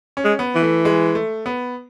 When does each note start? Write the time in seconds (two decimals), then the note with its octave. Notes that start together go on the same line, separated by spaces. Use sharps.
0.17 C#4
0.24 G#3
0.39 B3
0.55 E3
0.62 A3
0.85 G#3
1.15 A3
1.46 B3